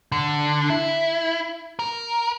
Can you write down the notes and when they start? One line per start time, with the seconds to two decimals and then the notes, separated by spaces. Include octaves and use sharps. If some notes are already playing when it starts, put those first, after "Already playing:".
0.12 D3
0.70 E4
1.79 A#4